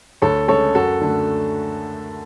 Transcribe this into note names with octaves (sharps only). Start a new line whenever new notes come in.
D2 A4 C#5
C#3 G#3 A4 C#5
F#2 F#4 A4
D3 A3